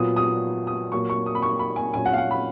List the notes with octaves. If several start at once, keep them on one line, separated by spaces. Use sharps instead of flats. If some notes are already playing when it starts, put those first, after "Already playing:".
Already playing: A#2 F#3 B3 F4 D#6
D#6
D#6
A#2 F#3 A#3 C#6
C#6
D#6
B5
C#6
B5
G#5
A#2 F#3 C#4 G#5
F#5
F5
F#5
B5